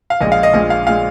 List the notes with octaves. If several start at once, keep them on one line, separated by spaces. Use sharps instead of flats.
F5
A#1 A#2 G#3 D#5
F5
D#5
A#1 A#2 G#3 D#5
F5
A#2 G#3 F5